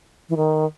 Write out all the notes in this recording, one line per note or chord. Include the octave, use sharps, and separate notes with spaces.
E3
D#3